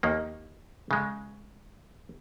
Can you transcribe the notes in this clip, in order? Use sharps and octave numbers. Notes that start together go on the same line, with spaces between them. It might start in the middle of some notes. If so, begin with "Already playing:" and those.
D#2 D#3 A#3
C#3 G#3